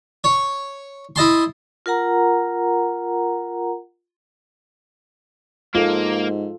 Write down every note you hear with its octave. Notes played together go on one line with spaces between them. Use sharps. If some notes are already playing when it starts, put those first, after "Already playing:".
C#5
E4 D#5 A5 C6
F4 A#4 F#5 A#5
G#2 A#3 F4 A4